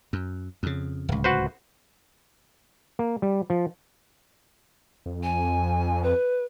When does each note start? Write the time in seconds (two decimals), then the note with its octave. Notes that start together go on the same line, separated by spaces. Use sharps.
0.13 F#2
0.63 F2 C#3
1.09 D1 C#2
1.24 F#4 B4 C5
2.99 A#3
3.22 G3
3.50 F3
5.06 F2
5.23 G#5
6.03 B4